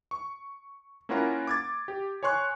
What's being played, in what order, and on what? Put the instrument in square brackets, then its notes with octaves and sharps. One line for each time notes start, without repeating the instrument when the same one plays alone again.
[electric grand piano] C#6
A#3 C#4 E4 F4 A#4 F#5
D6 G#6 A6
G4
C#5 G#5 C6 C#6 F#6